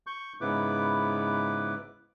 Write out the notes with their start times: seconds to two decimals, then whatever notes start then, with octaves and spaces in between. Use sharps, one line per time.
0.07 C#6 G6
0.41 G#2 C#3 B3 E4 B4 D6